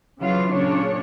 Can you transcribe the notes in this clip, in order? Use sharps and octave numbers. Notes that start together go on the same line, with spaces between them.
C#3 E3 F#3 F4 F5
A#2 C#3 D4 C#5